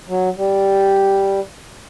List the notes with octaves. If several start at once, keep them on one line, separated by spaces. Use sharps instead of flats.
F#3
G3